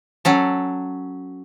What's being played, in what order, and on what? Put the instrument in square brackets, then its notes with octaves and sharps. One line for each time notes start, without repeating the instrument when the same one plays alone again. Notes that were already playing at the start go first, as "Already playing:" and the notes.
[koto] F#3 C#4 A4